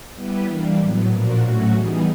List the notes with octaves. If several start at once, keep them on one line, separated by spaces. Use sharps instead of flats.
G3 B3 E4 G4 B4
E3 G3 A#3 D4
A2 F#3 B3
A#2 F3 A#3 D4 F#4
A2 F#3 A3 C#4 F#4
E3 G3 B3 D#4 G#4